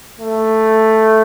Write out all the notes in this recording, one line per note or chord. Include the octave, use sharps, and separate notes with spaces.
A3